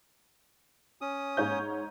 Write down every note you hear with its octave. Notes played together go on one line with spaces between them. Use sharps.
C#4 D#6
G#2 C#5 G6